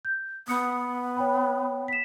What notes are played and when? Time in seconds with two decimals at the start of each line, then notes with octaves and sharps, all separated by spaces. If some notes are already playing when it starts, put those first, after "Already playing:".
0.05 G6
0.48 B3 D#6 C#7
1.17 C#5 G5 B5
1.88 B6 E7